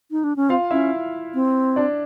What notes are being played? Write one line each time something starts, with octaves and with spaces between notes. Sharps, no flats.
D#4
D4
C#4
C4 F4 F5
C#4 E4 E5
C4
D4 D5